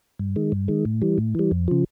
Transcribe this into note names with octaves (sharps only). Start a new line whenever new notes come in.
G2
D#3 G#3
G2
D#3 G#3
A2
E3 G3
A2
E3 G3
F2
C#3 F3